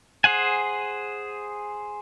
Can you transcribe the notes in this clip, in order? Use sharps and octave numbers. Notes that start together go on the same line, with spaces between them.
G#4 C5 F#5 G#5